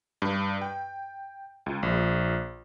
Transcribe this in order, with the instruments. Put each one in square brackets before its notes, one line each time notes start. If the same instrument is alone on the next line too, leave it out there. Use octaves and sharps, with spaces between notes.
[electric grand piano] G2
G5
C#2
A#1